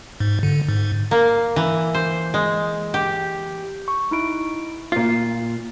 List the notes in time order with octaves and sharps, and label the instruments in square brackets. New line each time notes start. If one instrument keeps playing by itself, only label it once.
[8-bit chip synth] G#2
D3
G#2
[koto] A#3
E3
C5
G#3
G4
[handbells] C#6
D#4 E4 D7
[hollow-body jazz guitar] A#2 F4 [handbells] C7